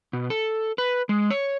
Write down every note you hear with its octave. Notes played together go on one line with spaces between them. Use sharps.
B2
A4
B4
G#3
C#5